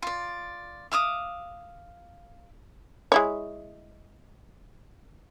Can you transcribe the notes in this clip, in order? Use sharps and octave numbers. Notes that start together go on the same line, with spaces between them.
F4 D5
E5 F5 D6 D#6
G#3 E4 C#5